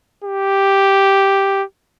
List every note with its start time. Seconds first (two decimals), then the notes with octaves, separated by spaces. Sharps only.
0.24 G4